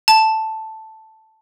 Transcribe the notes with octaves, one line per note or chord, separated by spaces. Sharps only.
A5